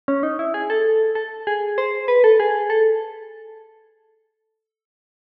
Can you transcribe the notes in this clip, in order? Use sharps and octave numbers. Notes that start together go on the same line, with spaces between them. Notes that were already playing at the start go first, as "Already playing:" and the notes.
C#4
D#4
E4
G#4
A4
A4
G#4
C5
B4
A4
G#4
A4